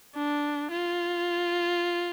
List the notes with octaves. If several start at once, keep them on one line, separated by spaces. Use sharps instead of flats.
D4
F4